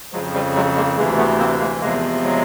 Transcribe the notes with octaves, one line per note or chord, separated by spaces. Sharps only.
F2 C#3 F3 F#3 G#3
F3 G3
F#3 G#3
G#3 A#3
D2 C3 E3 G#3 A#3
A3 B3
A#3 C4
G#3 A#3
E2 C3 F3 G#3 A#3
F#3 G#3